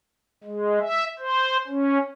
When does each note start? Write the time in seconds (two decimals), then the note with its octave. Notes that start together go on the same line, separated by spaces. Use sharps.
0.44 G#3
0.80 E5
1.19 C5
1.67 C#4